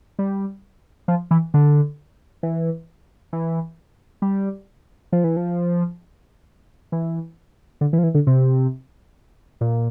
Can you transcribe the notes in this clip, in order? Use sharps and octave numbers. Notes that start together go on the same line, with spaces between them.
G3
F3
E3
D3
E3
E3
G3
F3
E3
F3
E3
D3
E3
F3
E3
D3
C3
A#2